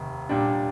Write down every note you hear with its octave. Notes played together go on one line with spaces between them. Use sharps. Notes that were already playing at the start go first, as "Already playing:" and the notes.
Already playing: F1 D#2
A#2 G3 D4